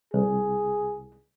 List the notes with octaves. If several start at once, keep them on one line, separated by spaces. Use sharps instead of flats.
C2 G#4